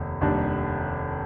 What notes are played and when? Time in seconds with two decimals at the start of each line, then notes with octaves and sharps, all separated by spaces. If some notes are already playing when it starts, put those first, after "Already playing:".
Already playing: F1 D#2 D#3
0.21 F1 D#2 D#3 G3 D4